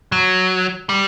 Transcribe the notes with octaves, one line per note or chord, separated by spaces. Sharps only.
F#3
G3